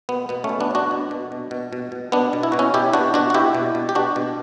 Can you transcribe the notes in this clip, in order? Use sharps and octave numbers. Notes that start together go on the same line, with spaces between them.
B2 B3
B2 B3
A3 C#4
B2
B3 D4
B2 D4 F#4
B2
B2
B2
B2
B2
B2
B2 B3 D4
B2
E4
B2 F#4
C#4 E4
B2 E4 G4
B2 D4 F#4
B2 D4 F#4
F#4
B2 E4 G4
B2
B2
G4
B2 D4 F#4
B2